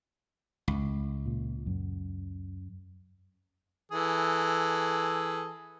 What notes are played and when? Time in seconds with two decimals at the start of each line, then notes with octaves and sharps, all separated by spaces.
0.68 C#2
1.26 A#2
1.66 F#2
3.92 E3 G#4 A4